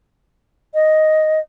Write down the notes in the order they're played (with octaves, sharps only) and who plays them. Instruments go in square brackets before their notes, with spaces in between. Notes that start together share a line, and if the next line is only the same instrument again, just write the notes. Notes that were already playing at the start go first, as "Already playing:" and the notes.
[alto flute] D#5